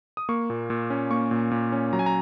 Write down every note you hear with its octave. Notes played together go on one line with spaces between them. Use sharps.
D#6
A#3 C#6
A#2
A#2
C#4
A#3 C#6
A#2
A#2
C#4
F#3 A#5
G#5
A#5